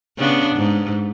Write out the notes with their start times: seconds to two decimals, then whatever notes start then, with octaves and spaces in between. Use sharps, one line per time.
0.18 C#3 B3 D4
0.56 G#2